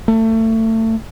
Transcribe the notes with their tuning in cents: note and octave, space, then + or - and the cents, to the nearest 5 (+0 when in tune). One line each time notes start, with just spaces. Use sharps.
A3 +25